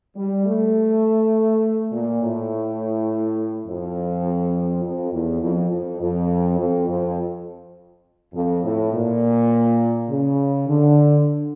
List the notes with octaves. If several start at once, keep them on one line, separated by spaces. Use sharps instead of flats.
G3
A3
A#2
A2
F2
F2
E2
F2
F2
F2
F2
F2
F2
A2
A#2
C#3
D3